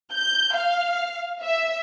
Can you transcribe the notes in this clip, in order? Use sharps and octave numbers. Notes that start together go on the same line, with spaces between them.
G6
F5
E5